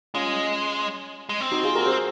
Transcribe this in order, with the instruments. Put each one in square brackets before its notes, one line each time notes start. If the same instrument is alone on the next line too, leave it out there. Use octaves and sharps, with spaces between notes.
[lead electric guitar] G#3 [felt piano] C#4 F4
[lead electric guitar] G#3
C4
[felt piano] D#4 F#4
F4 G#4
F#4 A#4
G#4 C5